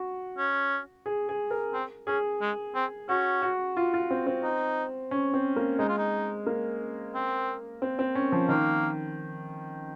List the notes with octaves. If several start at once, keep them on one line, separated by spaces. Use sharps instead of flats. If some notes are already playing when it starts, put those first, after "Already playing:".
Already playing: F#4
C#4
G#4
G#4
A#4
C4
C#4 G#4
G#3
C4
C#4 F#4
F#4
F4
F4
C4
C4
D#4
C#4
C4
A#3
G#3 D#4
F4
D#4
A#3
C4
C4
C4
C#4
F3
D#3 A#3